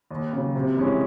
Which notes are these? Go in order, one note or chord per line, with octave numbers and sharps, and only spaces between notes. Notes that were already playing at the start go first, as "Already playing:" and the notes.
D#2
C#3 F#3
C3
E3 G#3 C#4